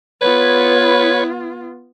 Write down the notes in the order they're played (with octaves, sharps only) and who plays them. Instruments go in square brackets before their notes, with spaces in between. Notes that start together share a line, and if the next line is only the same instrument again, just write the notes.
[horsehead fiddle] B3 F4 [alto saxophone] B4 [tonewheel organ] C#5 B5 G#6